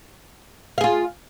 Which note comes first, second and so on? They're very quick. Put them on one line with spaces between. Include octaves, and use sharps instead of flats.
F5 G#4 F4